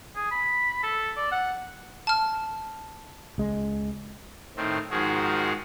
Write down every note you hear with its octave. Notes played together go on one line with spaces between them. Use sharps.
G#4
B5
A4
D5
F#5
A5 F6
C#2 G#3
A2 D#3 C4
G#2 D#3 F3 F#4 G#4